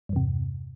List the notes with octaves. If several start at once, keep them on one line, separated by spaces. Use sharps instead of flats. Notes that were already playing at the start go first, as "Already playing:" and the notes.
E2 G2 C3